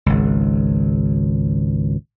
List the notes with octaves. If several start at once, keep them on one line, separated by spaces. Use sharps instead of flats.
G#1 C#2